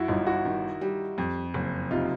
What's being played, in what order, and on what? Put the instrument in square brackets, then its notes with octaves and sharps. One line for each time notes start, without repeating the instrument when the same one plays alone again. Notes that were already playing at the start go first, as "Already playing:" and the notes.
Already playing: [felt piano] F#2 [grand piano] E4 F#4
[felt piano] G1 [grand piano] D#4 F4
[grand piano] E4 F#4
[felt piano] D#3
G3
F2
F#1
[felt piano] C3 [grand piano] D#4 F4